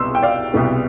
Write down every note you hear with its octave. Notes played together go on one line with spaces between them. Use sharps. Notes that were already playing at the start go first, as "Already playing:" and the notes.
Already playing: C2 B2 B3 C6 E6
G5
D5 F5
C2 B2 B3